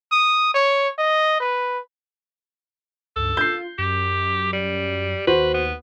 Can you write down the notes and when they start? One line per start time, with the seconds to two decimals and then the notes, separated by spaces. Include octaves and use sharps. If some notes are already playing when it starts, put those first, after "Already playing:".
0.12 D#6
0.55 C#5
0.99 D#5
1.40 B4
3.16 C#2 G2 A4
3.37 F4 G6 C7
3.78 F#2 G4
4.53 G3
5.27 D#2 F#4 B4 C5
5.54 B3